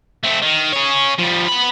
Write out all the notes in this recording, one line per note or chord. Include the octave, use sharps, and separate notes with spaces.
A3 C4
D#3
G#4 C#5
F3 G3
B3 B5